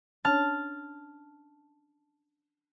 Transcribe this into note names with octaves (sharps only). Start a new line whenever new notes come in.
C#4 D4 C#5 A5 F6